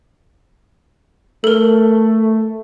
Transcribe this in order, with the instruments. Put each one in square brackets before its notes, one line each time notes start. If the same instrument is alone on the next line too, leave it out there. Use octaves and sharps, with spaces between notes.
[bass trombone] A3 [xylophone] A4 A#4